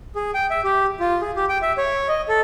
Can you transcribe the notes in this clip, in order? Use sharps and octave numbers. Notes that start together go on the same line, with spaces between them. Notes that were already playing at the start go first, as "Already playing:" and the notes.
G#4
G5
E5
G4
F4
G#4
G4
G5
E5
C#5
D#5
A4